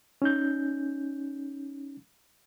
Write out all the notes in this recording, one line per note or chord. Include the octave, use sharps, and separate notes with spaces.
C#4 D#4 G6